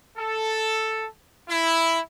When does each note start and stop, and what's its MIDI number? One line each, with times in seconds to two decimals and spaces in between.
0.16 1.05 69
1.48 1.99 64